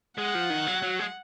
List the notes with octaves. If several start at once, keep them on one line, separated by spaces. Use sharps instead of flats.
G#3 F#5
F3
D#3
F#3
F#3
G#3